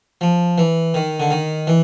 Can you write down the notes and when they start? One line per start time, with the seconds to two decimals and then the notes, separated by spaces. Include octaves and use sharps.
0.21 F3
0.58 E3
0.94 D#3
1.20 D3
1.30 D#3
1.67 E3